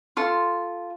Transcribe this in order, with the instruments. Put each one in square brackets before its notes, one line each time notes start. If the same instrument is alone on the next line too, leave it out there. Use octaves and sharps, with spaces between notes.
[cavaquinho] F4 A4 C6